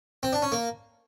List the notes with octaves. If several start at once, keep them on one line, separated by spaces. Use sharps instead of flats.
C4
D4
C#4
A#3